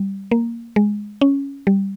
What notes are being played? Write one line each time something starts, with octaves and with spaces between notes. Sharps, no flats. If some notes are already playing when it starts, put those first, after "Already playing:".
Already playing: G3
A#3
G#3
C#4
G3